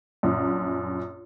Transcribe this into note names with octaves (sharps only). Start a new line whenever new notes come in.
A#1 F#2